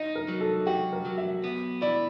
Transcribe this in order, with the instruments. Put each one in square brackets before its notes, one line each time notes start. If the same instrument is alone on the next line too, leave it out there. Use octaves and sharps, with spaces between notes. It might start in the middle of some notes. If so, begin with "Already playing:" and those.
Already playing: [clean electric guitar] D#4 [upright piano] D#5
[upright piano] A#4
[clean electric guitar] F#3
[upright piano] A4
[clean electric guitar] F#4 [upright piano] G4
[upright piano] A#4
[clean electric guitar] F#3
[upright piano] E5
[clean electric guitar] B3
[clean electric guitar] E4 [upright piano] D5